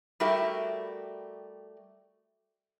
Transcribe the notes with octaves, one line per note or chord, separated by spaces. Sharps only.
G3 A3 F#4 G4 A#4 E5